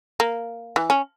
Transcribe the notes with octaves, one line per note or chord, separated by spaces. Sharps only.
A#3
E3
C#4